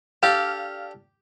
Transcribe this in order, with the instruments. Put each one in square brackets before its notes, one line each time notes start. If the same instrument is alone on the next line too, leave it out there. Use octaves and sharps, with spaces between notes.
[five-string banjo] D4 A4 [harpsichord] G4 [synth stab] F5 F6